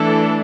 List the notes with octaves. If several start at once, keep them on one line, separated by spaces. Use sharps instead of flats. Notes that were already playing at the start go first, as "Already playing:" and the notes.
Already playing: E3 A3 D4 A4